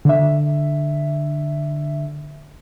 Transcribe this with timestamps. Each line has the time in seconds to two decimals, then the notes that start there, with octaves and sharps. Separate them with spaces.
0.05 D3 E5